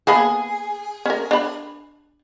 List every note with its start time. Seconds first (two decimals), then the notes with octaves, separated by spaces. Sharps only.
0.07 A#3 B3 G#4 B5
1.06 C#4 A#4
1.31 D4 B5